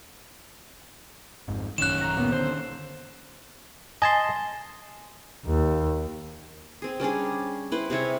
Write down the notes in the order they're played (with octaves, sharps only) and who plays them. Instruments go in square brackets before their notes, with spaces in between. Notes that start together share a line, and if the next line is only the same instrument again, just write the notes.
[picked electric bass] G#1 F2 G#2
[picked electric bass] A1 F#2 [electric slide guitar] D#3 C#4 [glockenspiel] F#6 E7
[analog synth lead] A#5
[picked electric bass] C#2 A#2 A#3 [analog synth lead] B3
[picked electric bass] D3 [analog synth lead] C5
[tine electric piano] D#5 A5 C6 [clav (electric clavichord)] G#5
[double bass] D#2
[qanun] C4 G#4
G3 C#4 D4 G#4
E4 B4 C5
C3 G#4 C#5 E5